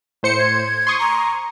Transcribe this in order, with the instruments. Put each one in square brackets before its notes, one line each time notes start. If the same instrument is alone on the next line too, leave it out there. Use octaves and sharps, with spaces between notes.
[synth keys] A2 C5 C#7
[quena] G#6
[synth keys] C6 C#6 D#6
[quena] A#5